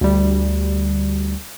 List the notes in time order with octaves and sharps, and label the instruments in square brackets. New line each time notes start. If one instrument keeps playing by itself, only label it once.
[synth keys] D2 G3